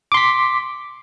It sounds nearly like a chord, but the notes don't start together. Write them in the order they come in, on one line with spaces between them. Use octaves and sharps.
D6 C6 B6